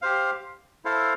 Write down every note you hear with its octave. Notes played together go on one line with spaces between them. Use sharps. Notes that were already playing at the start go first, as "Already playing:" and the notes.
G4 C5 F5
E4 A4 C5 F5